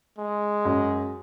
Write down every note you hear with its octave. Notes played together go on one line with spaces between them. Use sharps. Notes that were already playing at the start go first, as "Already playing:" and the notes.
G#3
F#2